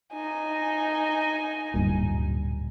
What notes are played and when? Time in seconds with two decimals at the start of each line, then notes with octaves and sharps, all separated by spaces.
0.12 D#4 G#5
1.74 D1 G2 A#2